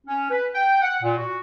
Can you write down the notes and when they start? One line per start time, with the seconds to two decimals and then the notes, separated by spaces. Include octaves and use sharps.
0.07 C#4
0.29 B4
0.54 G5
0.82 F#5
1.02 A#2
1.17 F#4